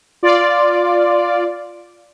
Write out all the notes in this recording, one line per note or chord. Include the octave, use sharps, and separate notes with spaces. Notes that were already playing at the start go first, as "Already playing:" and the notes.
F4 D5